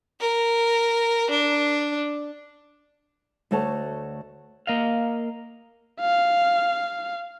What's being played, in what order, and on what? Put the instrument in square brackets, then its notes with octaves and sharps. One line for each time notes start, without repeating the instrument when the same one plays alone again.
[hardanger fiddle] A#4
D4
[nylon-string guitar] D2 A3 F#4 C#5 A5
[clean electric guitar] A#3 D#5 F5
[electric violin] F5